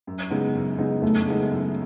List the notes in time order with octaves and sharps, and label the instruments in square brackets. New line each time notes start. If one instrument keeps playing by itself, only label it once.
[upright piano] F#2
C#3 G#3 B3 D#4
F#2
C#3 G#3 B3 D#4
[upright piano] F#2 [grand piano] A3
[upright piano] C#3 G#3 B3 D#4
F#2